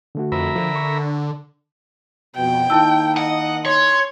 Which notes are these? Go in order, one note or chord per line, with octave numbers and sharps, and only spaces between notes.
D3 A3 F#4
F2 A#4 E5 B5
D3 F3 D4
C#6
F2 B2 G5
D#3 A#3 D#4 E4 A5 E6
D#5 F#5
C#5 C6